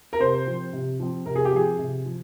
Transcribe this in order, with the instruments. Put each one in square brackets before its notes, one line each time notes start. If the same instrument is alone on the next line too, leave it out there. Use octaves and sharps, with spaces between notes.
[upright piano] A#4
[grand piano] C3 [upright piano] C5
[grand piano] F3 C4
C3
F3 C4
[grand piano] C3 [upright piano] A#4
[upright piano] G#4
G4
[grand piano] F3 C4 [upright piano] G#4
[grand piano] C3
F3